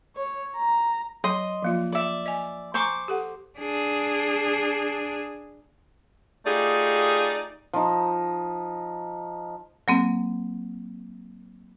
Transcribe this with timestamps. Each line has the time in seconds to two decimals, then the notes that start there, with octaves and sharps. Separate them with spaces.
0.16 C#5
0.56 A#5
1.24 F#3 D#5 C6
1.63 F3 A#3 F4
1.92 D5 E5
2.26 D#5 G#5
2.74 C5 G#5 A#5 C#6 D6
3.08 G4 A4 F#5
3.59 D4 G#4
6.46 A3 D#4 F4 G4 G#4 D5
7.73 F3 D#4
9.88 F#3 A#3 C4